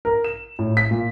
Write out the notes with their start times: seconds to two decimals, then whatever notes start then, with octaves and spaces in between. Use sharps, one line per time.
0.05 A#4
0.24 E7
0.59 A2
0.77 B6
0.91 A#2